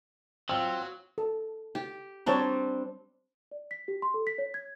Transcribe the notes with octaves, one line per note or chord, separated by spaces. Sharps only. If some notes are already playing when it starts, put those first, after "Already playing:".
F#3 C4 F4 E6
A4
G4
G3 C4 D4 C#5 A5 A#5
D5
B6
G4
C6
A4
B6
C#5
G#6